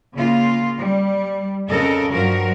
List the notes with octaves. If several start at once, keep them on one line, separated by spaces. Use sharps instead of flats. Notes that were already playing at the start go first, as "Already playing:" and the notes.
C#3 A#3 F4
G3
F2 C#3 A4 A#4 D#5
G2 F3 F#3 F#4 A#4